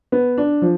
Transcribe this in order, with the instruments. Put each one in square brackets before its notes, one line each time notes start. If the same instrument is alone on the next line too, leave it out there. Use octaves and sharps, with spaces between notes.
[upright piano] B3
D4
F3